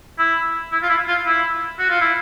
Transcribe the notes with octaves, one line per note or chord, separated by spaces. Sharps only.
E4
E4
F4
E4
F4
E4
F#4
F4
E4